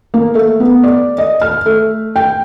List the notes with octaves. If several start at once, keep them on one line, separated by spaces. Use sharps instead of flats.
A#3
A3
B3
D5
D#5
F6
A3
G5